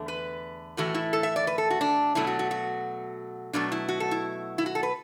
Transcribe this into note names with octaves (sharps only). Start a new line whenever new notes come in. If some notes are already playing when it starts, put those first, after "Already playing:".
Already playing: E2 D3 A3
B4
A2 E3 A3 F#4
E4
A4
E5
D5
B4
A4
F#4
D4
B2 F#3 A3 E4
F#4
F#4
F#4
B2 F#3 A3 D4
E4
F#4
A4
E4
E4
F#4
A4
B4